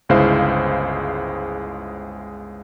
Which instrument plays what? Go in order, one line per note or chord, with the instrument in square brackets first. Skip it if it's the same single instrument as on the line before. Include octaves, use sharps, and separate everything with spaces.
[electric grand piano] G1 C#2 G#3 E4 C5 F5